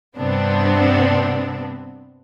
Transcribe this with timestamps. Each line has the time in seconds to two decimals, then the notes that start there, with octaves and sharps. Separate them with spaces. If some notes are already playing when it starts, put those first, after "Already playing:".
0.17 G2 C3 B3 C4 D4